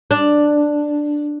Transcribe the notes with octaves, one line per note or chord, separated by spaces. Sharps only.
D4